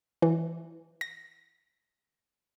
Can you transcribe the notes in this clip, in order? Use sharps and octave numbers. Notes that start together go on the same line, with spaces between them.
E3
A#6